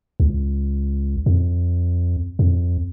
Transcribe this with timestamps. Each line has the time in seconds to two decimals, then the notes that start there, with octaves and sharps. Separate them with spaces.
0.20 C#2
1.26 F2
2.39 F2